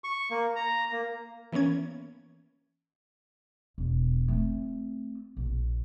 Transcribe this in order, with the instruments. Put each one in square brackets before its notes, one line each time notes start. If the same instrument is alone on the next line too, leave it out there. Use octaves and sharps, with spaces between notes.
[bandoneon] C#6
A#3
A#5
A#3
[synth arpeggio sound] E3 A#3 B3 C#4 G#6
[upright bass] E1
A3 C4
A#1